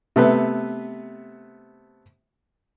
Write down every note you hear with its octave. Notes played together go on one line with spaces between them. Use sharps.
C3 A3 B3 B4